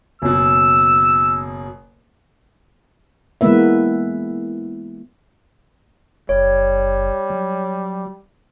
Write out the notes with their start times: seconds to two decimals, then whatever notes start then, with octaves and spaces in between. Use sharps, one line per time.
0.22 F#1 B2 E6
3.41 E3 G#3 A#3 B3 B4 E5
6.29 F#1 G3 C#5
7.30 F#3